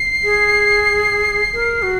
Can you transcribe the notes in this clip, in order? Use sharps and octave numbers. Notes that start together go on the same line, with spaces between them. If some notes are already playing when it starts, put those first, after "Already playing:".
Already playing: C7
G#4
A#4
F#4